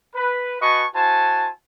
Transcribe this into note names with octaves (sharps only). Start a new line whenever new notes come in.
B4
F#4 B4 D#5 G#5 A5 C#6
E4 F#4 C5 G#5 A5